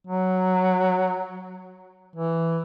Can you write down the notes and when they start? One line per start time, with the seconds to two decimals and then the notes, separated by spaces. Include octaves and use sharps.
0.07 F#3
2.16 E3